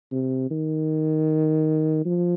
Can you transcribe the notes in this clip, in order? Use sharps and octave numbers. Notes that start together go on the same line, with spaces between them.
C3
D#3
F3